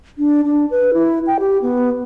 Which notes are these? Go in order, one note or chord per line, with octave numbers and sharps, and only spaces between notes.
D4
D4
B4
E4
G5
G4
B3